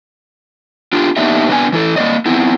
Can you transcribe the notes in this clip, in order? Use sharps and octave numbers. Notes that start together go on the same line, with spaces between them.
D4 F4 G4
A#3 B3 D4 D#4 G4 E5
C3 B3 D4 B4 G#5
E3 E4 A4
A#3 B3 D5 D#5
B3 C4 E4